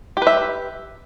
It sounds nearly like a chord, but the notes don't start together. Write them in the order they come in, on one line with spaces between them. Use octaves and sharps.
G4 B4 E5